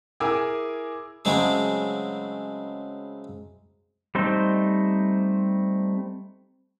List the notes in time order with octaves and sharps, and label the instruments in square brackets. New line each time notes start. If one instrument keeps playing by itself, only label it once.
[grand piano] E4 G#4 A#4 G#5 D6 E6
[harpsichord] C#3 F#3 G#3 A3 C4 G#4
[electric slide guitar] G3 A3 C4 D#4 C5